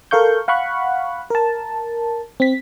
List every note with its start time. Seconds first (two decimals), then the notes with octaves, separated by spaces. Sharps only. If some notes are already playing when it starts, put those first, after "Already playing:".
0.11 A4 A#4 F5 C#6 G6
0.48 F5 F#5 B5 C#6 F#6
1.30 A#4 A5
2.40 C4 B6